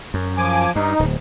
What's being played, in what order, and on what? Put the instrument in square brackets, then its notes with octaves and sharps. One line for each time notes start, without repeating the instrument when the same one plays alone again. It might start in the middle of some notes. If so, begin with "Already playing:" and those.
[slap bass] F#2
[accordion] F3 G#5 D6
[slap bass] G2 [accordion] D#4
[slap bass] D1